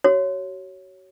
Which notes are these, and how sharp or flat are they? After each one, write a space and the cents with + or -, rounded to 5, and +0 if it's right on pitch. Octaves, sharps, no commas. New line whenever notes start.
F#4 +35 C#5 +0